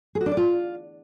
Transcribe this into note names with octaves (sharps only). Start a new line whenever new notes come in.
G#4
F#4
D4
D5
F4